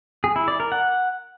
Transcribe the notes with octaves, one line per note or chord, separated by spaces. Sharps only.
G#4
E4
D5
A#4
F#5